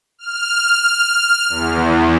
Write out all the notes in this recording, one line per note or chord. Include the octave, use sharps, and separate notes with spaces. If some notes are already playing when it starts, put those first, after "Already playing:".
F6
E2